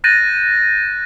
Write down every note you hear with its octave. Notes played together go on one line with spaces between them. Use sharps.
F#6 G6 A6 A#6 D#7